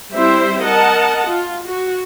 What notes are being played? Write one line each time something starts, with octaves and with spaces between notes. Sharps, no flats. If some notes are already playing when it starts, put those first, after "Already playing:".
G3 C4 E4 G4 C5 E5
A#4 D#5 F#5 A5
F4
F#4